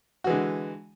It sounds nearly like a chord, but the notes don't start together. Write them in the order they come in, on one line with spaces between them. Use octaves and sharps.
F#4 E3 G#3 D3